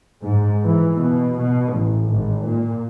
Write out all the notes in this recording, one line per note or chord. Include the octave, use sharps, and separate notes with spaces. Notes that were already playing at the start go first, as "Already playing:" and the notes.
G#2
E3
B2
B2
A1
G#1
A#2